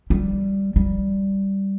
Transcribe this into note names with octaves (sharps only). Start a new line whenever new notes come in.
G3
G3